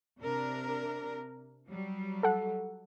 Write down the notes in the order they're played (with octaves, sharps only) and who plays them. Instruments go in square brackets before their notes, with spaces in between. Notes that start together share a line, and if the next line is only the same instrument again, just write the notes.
[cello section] C3 D4 A#4
F#3 G3
[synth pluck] A4 F#5